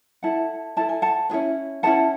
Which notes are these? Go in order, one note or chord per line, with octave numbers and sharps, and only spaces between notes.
E4 A4 F#5 A5
E4 A4 A5
G#5
F#5 A5
C#4 E4 G#4 B4
C#4 E4 G#4 B4 F#5 A5